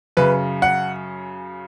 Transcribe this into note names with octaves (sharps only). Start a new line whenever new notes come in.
F#2 C#3 B4
F#5